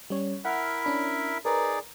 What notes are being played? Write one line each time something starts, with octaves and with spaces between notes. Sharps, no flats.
G3 C#4 C#5
E4 A#4 E5 F#5 F6
C#4 D4 B5
D#4 G#4 A#4 B4 D5 A#5